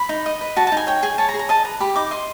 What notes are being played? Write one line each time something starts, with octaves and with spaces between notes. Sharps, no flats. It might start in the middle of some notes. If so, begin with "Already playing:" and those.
Already playing: B5
D#4
D#5
B4
F#4 A5
A5
D#4
G#5
C#5 G5
G#4 G#5
C#5 A5
A#5
G#4
A#5
D#5 A5
B4 A#5
G4 B5
D#4 D6
D#5 C6